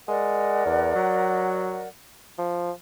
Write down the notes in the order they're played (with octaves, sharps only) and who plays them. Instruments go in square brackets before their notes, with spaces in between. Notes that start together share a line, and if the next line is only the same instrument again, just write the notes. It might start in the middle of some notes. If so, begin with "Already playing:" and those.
[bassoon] G#3 [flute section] A#4 D5 F#5
[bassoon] E2
F#3
F3